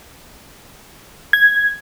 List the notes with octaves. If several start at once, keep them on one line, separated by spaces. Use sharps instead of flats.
G#6